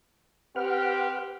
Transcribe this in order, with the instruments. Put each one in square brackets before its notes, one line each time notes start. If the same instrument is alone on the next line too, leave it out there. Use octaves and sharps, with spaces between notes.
[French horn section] C4 G4 [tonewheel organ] B4 F#5 F6